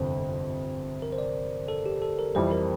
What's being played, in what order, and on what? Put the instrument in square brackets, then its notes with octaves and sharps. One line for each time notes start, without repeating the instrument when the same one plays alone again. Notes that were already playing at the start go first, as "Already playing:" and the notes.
Already playing: [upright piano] G1 F2 C3 [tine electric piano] C5
[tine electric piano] A#4
C5
D5
A4
G4
A4
A#4
[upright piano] F2 E3 G3 C4 [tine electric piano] C5
[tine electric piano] A#4